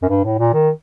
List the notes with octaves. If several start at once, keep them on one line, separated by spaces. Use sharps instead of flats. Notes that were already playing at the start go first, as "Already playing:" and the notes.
F#2
G2
A2
A#2
D#3